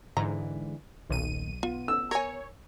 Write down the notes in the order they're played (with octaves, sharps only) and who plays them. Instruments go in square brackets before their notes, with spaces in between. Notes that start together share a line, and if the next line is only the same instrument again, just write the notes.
[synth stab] G#2 [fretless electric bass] D3 E3 [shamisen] A#5
[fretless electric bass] D#1 A#2 D#3 [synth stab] B1 D#7
[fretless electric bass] B3 [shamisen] F4
[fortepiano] E6
[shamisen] A#4 G#5 [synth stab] C#5